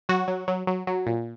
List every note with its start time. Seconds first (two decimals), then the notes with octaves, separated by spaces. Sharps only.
0.09 F#3 F#4
0.28 F#3
0.48 F#3
0.67 F#3
0.87 F#3
1.06 A#2